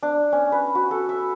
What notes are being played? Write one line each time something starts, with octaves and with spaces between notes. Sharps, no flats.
D4
C#4
B4
F#4
A4
E5